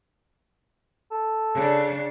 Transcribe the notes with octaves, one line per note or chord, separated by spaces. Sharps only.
A4
C#3 D4